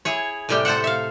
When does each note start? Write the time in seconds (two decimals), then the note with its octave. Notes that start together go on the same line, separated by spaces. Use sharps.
0.05 E4 G#4 C#5
0.49 A2 C3 G3 G4 G5
0.65 A4 C5 E5 F#5
0.84 E5 F5